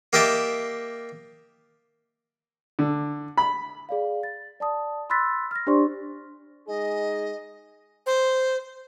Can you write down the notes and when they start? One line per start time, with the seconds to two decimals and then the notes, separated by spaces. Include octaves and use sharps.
0.13 A#3 G4 D#5 E5 A5
2.79 D3
3.38 B5
3.89 G#4 D5 F5
4.23 A6
4.60 D5 A5 D#6
5.10 B5 C6 E6 F#6 A6 B6
5.51 F6 A#6
5.67 D4 G4 C5 D5 C6 C#6
6.68 G#3 D#4 G#4 D#5
8.06 C5